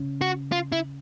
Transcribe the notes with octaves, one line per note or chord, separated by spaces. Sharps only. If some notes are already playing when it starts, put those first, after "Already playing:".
Already playing: C#3
F#4
F4
E4